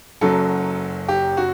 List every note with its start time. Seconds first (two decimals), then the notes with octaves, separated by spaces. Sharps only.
0.21 F#1 F#2 F#3 A4
1.08 G4
1.37 F#4